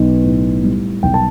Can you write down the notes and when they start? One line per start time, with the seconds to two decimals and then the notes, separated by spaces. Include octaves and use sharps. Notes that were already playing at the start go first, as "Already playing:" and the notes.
Already playing: B1 B3
0.24 A2
0.64 G3
1.03 B1 G5
1.14 A5